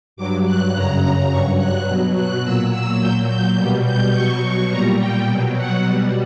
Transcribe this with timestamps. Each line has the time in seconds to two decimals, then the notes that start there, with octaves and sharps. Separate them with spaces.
0.17 G2 F#3 D6
0.45 F#6
0.74 F#2 C#3 F#3 A#5
1.30 G2 F#3 C#6
1.58 F#6
1.86 B2 F#3
2.15 F#6
2.43 A#2 F#3 E6
2.71 E6
3.00 A#2 F#3 G6
3.28 G6
3.57 B2 G3
3.84 G6
4.13 B2 F#3 C#6
4.70 A#2 G3 A#5
4.99 G5
5.27 B2 F#3
5.55 F#5
5.84 B2 G3